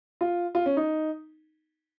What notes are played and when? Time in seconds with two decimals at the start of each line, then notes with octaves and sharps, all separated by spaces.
0.21 F4
0.55 F4
0.66 C#4
0.77 D#4